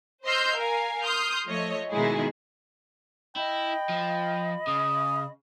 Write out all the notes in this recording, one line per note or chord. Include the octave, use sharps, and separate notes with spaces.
C5 D#5 C6 E6 F6 G6
A#4 F5 G#5
C6 D#6 F6 G6
F3 A3 C#5 D#5
B2 D#3 G#3 D#4 E4 G#4
E4 D#5 G5 B5
F3
C#3 D#6